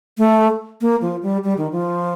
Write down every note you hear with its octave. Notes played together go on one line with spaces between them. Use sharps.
A3
A#3
F3
G3
G3
D#3
F3